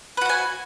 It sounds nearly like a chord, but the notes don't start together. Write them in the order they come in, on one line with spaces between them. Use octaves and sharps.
B4 F#4 F#5 G#5